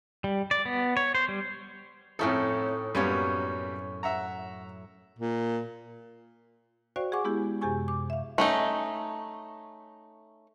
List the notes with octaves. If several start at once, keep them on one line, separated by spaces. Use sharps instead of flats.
G3
D5
B3
C#5
C5
G3
F2 A2 C#4 D#4 E4 A4
F#2 G3 A#3 B3 C#4 C#5
E5 F#5 A#5
A#2
F#4 C5 D5 F5 G5 C#6
G#4 F#5 G#5 C#6 D6
G#3 B3 E4 G4 G#4
F#2 C3 G4 G#4 G#5 C#6
D6
E5 F5
A3 C#4 D#4